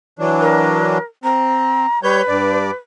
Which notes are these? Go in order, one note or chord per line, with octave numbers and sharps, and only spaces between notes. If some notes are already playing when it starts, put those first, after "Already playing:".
E3 F#3 D4
A#4
C4 A#5
G3 B4 C#5 G6
G2 D5